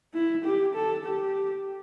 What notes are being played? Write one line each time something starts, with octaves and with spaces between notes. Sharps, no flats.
E4
G4
A4
G4